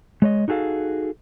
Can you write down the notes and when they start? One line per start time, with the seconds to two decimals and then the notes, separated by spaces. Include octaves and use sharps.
0.22 G#3 C#5 D#5
0.48 D#4 F#4 G#4 A4 F5